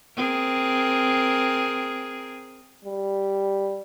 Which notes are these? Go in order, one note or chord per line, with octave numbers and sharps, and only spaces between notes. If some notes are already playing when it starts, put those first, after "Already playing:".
C4 G#4 A#4
G3